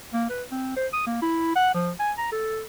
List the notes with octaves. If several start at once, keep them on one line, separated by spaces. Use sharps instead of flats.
A#3
B4
C4
C5
D#6
A#3
E4
F#5
F3
G#5
A#5
A4